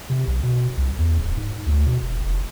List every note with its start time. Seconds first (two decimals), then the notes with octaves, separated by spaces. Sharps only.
0.10 C3
0.28 B1
0.43 B2
0.77 C2
0.99 E2
1.18 D1
1.37 G#2
1.67 D2
1.86 B2
2.03 E1
2.21 F1